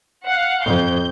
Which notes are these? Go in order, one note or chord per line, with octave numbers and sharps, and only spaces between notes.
F5 F#5
F2 G6